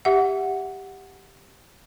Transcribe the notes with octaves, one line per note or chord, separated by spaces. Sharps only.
G4 E5 F#5